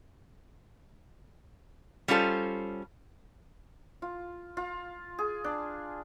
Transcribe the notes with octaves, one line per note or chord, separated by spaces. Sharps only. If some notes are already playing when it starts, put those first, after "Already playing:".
G3 C#4 F4 A4 C5
F4
F4
G#4
D4